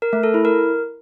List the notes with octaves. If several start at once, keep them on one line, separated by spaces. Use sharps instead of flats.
A#4
A3
A4
E4
A#4